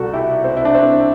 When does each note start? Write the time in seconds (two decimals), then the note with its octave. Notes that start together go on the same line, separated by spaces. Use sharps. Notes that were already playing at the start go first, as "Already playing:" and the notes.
Already playing: C2 B2 F#4 A4
0.14 E4 G4
0.44 C4
0.57 E4
0.65 D4
0.75 C4